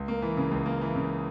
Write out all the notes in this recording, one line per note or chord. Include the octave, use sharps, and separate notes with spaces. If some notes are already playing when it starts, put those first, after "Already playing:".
Already playing: C#2
A#3
E3
C#3
C#2
A#3
E3
C#3